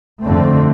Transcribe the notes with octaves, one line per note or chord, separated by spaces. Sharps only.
F2 D3 A3 C4